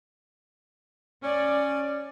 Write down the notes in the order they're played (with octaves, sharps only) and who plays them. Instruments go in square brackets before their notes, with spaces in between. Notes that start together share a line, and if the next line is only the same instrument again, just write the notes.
[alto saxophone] C#4 [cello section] D5